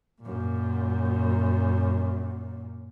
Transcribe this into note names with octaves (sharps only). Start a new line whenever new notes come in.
F#2 A#2